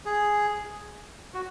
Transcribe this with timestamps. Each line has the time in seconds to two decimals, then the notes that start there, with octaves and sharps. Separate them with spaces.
0.06 G#4
1.34 F#4